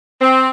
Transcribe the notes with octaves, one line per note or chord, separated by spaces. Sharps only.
C4